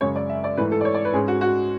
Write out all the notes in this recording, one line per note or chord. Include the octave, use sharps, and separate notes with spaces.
F#2 C#3 G#3 C#4 C#5
D5
E5
D5
G#2 E3 A3 B4
A4
D5
C#5
D5
B4
G#2 G#3 C#4 G#4
F#4
F#4